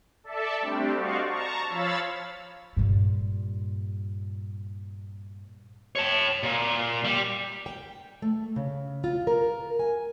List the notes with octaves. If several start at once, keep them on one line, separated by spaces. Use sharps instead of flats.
A4 D5 E5 A5
G3 A3 C4 D4 G4
F#4 C5 D5 D#5 F5 C#6
A5 A#5 C#6
F3 C#5 F5 B5 E6 A6
G2 A#2
C#5 A5
A#2
G3
G5
A3
C#3
F4
A#4
G#5